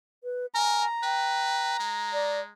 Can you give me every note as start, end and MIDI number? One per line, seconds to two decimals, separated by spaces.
0.24 0.46 71
0.55 0.85 70
0.55 0.86 80
0.55 2.49 82
1.03 1.76 71
1.03 1.75 79
1.80 2.53 56
2.13 2.40 74